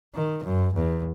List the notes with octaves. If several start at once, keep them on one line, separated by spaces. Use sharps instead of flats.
D#3
F#2
E2